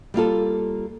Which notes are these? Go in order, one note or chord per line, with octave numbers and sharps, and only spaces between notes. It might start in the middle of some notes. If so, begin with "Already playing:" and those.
G3 A#3 F4 A4